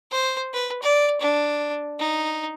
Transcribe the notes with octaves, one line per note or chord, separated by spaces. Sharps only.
C5
B4
D5
D4
D#4